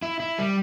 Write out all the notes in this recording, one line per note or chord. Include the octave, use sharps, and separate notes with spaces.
E4
E4
G3